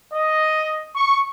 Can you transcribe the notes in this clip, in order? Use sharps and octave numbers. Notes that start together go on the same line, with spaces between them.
D#5
C#6